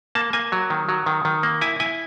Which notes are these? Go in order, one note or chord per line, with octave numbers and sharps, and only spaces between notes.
A#3 A5
A#3 G#5
F#3
D#3
F#3
D#3
D#3
A#3
E4 G#5
E4 G#5